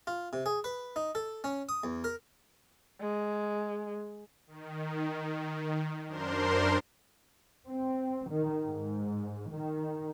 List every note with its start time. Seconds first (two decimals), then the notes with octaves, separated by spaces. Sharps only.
0.07 F4
0.33 C3
0.46 G#4
0.64 B4
0.96 D#4
1.15 A4
1.44 C#4
1.69 D#6
1.84 E2
2.04 A#4
3.01 G#3
4.47 D#3
6.07 F#2 D4 A#4 C5 C6
7.66 C4
8.30 D#3
8.64 G#2
9.55 D#3